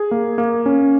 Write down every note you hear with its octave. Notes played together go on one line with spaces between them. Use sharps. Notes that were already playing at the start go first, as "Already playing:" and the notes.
Already playing: G#4
A#3
A#3
C#4